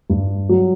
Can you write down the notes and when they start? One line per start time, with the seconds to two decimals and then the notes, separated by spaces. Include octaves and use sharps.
0.10 G2
0.49 F#3